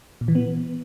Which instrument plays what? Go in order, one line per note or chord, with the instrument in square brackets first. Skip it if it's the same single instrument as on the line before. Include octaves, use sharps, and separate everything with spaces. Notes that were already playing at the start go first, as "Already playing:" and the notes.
[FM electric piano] A#2
E3
B3